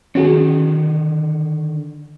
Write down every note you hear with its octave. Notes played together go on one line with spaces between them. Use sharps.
D3 D#3 C#4 F#4 G#4 A#4